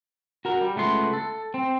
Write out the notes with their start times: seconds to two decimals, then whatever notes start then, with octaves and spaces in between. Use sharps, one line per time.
0.45 F#4 A#4
0.61 G3
0.76 C#2 A3 B3 C6
1.13 A4
1.54 C4